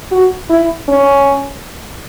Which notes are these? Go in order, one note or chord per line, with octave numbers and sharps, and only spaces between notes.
F#4
E4
C#4